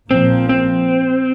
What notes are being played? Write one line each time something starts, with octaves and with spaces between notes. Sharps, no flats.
A#1 A#2 F3 A#3 C4
C4